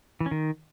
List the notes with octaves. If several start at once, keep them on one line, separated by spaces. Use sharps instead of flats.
E3
C#4
D#3